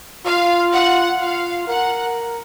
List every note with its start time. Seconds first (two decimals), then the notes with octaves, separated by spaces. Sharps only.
0.25 F4 F5
0.73 F#5
1.20 F4 F5
1.68 A#4 F#5